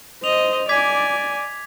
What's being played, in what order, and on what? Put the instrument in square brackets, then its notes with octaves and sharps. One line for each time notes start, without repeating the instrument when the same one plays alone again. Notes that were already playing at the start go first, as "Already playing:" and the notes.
[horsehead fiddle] C5 [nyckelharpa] D#5 [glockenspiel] F7
[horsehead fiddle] D5 [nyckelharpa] G#5 [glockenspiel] D6 G#6 B6